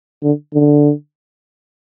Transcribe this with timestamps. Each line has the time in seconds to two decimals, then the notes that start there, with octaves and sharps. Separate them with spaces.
0.23 D3
0.54 D3